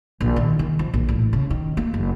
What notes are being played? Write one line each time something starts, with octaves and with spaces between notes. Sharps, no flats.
A#1
D#3
D#3
F3
A#1
A1
C#3
D#3
A#3
F#1